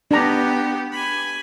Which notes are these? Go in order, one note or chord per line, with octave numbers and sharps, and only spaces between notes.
B3 D4 G4 A#5
G#5 B5